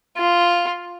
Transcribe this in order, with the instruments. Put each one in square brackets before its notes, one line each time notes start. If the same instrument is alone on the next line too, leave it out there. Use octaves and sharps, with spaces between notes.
[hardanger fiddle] F4